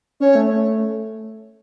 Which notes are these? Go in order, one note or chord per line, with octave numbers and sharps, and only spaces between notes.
C#4 C#5
A3